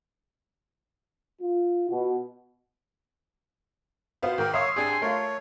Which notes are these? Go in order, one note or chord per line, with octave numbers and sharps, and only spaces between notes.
F4
B2
B2 B3 F4 C5 F5
G#2 D#3 A#4 G5
C#5 E5 F5 C6 C#6 D#6 E6
G#1 D4 G4 G#4 G#5
A3 F4 A#4 C#5